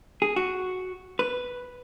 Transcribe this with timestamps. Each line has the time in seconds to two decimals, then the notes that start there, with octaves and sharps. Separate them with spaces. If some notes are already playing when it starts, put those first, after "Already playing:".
0.22 G#4
0.36 F#4
1.19 B4